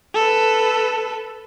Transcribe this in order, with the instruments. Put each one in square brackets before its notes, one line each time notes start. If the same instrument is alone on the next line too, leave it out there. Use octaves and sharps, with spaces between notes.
[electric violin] A4 B4